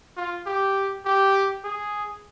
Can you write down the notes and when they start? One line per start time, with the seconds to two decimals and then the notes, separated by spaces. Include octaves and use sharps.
0.17 F4
0.46 G4
1.05 G4
1.64 G#4